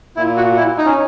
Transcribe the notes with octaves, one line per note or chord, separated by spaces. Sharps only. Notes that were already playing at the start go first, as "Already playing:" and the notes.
A#2 E4
F#4
E4
D#4
C#4